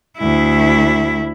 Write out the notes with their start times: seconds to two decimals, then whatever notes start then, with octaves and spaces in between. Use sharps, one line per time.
0.18 D2 E4